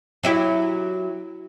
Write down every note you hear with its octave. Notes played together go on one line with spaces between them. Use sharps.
F#3 E4 G4